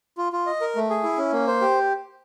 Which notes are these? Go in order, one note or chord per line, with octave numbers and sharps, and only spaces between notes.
F4
F4
D#5
A#4
A3
G#4
E4
C#4
A#3
C5
G4